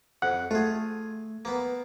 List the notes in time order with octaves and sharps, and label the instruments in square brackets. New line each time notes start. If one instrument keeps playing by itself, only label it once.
[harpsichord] F2 [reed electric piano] F#5
[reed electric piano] A3 [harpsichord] F4 G#4
[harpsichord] A#3 B3